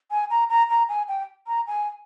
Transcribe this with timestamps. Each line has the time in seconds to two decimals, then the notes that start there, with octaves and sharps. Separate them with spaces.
0.11 G#5
0.30 A#5
0.49 A#5
0.69 A#5
0.89 G#5
1.08 G5
1.47 A#5
1.67 G#5